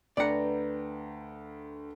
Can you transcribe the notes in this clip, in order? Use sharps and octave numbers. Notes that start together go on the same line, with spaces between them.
D2 B4 D5 F#5 G5 A#5